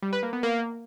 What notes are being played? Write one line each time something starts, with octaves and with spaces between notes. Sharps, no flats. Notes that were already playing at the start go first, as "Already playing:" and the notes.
G3
B4
A#3
B3
A#3